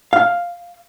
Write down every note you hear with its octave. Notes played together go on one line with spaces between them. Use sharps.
F5